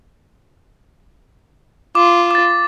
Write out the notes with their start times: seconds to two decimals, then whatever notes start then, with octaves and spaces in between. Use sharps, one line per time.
1.95 F4 D6
2.31 D6 A6